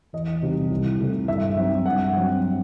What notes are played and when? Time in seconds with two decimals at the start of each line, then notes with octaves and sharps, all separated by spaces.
0.13 E2 D#5
0.42 C3 D#3 G3
0.71 C2
0.99 C3 D#3 A3 E4
1.28 G2 E5
1.57 F#3 C4 D#4
1.85 G2 F#5
2.15 F#3 C4